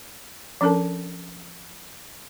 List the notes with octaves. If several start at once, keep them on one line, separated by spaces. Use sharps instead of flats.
F3 C#4 D4 A4 A#4 A5